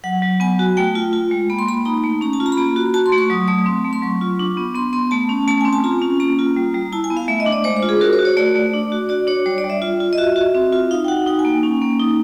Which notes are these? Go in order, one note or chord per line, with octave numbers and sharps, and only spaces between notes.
F#3 F#5
F#3
B3 G#5
F#4
A3 G5
F4
F4
G#3
A#3 B5
C6
A#3 B5
D#4 A#5
A3
C#4 A#5
A5
F4
A#5
B5
A#3 A#5
F#4
F#4 A5
C6
A3
C#6
F#3 D#6
A3 D#6
C4
A3
C6
F#3 C#6
F4
D4
B3
B3 C6
B3 C6
A3 A5
C#4
A3 A5
C4 G#5
A5
F4 A#5
C#4
A#3 A#5
F4
G3
G3
E4 A5
G#5
B3
F5
A3 E5
D#5
D4
D5
G#3 C5
C5
F4
G#4
F#4 A#4
C5
F#4
C#5
A3 D5
A3
D4
F#4
F#4 D5
D4 C#5
G3 C#5
D5
G3
E5
F4
F4
D#5
F#4 E5
F#4
C4
F4
D#4 F5
G5
F#4 F#5
D#4 G5
G#5
A#3
C#4
A#3
D#4